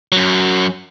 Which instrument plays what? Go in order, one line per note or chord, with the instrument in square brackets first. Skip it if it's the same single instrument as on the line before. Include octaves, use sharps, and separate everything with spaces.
[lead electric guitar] F#2 F#3